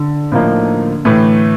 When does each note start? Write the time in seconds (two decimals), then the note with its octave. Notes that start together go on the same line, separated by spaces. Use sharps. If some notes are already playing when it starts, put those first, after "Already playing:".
Already playing: D3
0.32 A2 F3 A#3 D#4
1.05 A2 E3 A3